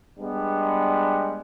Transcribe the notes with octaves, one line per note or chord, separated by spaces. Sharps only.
G3 G#3 B3 D4